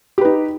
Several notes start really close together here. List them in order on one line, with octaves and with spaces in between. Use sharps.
G4 B4 D#4